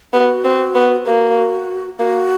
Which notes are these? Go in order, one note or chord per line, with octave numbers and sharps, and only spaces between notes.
B3 F#4 G4
C4
B3
A#3 F#4 G4
A#3 F#4